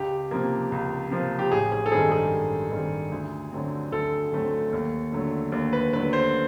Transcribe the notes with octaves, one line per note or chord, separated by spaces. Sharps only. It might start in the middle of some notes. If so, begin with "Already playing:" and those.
Already playing: C#2 G4
C3 F3 A#3
C#2
C3 F3 A#3
G4
A1 G#4
G#4
A4
G2 D#3 G#3 C4 G#4
G#4
A1
G2 D#3 G#3 C4
D2
D3 F#3 A3 C4
D2 A4
D3 F#3 A3 C4
D#2
D3 F#3 A3
D#2
B4
D3 F#3 A3 B4
C5